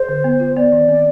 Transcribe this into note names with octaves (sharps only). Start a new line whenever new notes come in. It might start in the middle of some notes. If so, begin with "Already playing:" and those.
Already playing: G#4 C5
D3
B3
F4
B3 D5
D#3
C4